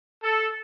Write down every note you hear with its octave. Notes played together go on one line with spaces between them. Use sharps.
A4